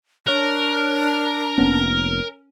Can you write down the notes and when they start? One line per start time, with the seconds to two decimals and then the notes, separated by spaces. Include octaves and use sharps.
0.27 D4 A#4 C#5 F6 F#6
1.58 F1 A#3 B3 C#4